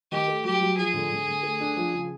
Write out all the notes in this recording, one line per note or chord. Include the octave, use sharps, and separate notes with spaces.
D#3 G4
A3
F#3 G4
F#3
F3 G#4
D3
D3
D3
A3
D4
F3
C#3